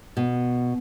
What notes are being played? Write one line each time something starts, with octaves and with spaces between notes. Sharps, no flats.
B2